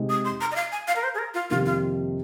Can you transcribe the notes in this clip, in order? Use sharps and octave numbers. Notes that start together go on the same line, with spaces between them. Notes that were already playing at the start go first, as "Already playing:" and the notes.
Already playing: C3 G#3 D#4
D#6
C6
A#5
D#5
F5
G#5
F5
A#4
C5
G#4
A#4
F4
F2 C3 D#3 A#3 D#4 F4
F4